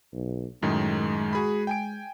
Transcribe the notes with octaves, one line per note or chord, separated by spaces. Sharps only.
B1
F#2 A2 D#3 G#3
F#4 G#4 B5
G5 G#5 D7